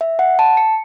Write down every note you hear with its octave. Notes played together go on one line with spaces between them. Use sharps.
E5
F#5
A5
C#7